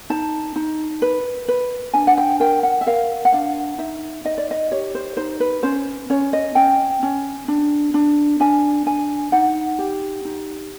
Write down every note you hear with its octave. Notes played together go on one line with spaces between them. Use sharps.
D#4 A5
D#4
B4
B4
D4 G#5
F#5
G5
A#4 G5
F#5
E5
A#4 F5
F#5
D4 F5
D#4 E5
D#4 D#5
D5
D#5
G4 C#5
C5
D#4 C5
B4
C#4 C5
C#4 C#5
D#5
C#4 G5
C#4
D4
D4
D4 G#5
D4 G#5
D#4 F#5
G4
D#4